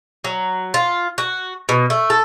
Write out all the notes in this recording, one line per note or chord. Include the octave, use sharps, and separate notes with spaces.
F#3
F4
F#4
B2
A3
A4